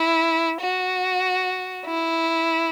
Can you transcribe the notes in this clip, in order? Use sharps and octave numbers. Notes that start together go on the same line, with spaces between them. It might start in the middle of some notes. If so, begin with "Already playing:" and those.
Already playing: E4
F#4
E4